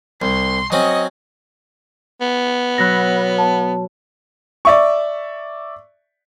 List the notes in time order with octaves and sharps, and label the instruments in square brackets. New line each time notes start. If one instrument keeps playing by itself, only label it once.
[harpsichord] C2 [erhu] C6
[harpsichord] F#3 C4 C#4 [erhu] D#5
[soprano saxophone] B3
[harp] B2 F#3 B5 [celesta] F#6 A#6
[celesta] A5
[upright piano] D5 E5 C#6